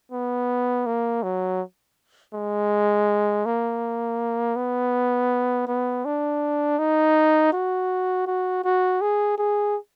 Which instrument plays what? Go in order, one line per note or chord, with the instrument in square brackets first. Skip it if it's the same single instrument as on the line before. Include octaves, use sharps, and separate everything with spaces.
[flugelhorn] B3
A#3
F#3
G#3
A#3
B3
B3
D4
D#4
F#4
F#4
F#4
G#4
G#4